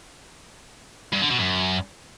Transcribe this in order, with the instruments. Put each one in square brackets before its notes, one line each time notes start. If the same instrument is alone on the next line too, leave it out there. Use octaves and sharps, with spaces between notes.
[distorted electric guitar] G2
D3
B2
F#2